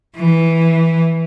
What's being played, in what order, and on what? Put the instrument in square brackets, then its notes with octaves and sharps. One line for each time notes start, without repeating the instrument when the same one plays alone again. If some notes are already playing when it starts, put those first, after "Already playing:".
[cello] E3